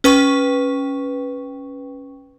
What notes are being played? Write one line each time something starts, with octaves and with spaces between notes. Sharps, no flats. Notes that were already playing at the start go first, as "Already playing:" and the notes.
C#4 B4 G5 C#6